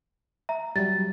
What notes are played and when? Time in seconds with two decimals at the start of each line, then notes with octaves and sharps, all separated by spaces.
0.49 E5 A#5
0.76 F#3 G3 A6